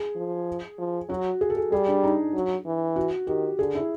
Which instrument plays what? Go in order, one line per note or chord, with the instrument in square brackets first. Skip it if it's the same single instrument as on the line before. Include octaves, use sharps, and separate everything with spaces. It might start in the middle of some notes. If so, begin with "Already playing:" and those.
Already playing: [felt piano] G#4
[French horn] F3
F3
[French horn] F#3 [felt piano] F#4
[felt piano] G#4
A4
G#4
[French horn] G3 [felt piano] G#4
[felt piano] D4
D#4
[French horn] F#3
E3
[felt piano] F#4
[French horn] D#3 [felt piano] G4
[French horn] D3 [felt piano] G#4
[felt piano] E4